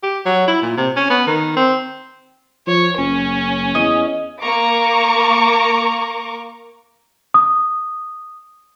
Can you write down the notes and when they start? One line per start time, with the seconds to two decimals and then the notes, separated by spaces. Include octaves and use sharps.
0.03 G4
0.26 F#3
0.48 E4
0.62 A#2
0.77 C3
0.96 C#4
1.10 B3
1.27 D#3
1.57 C4
2.67 F3 C#5
2.97 F#1 C#4
3.75 E2 D#5
4.42 A#3 A#5 C#6 D6
7.34 D#6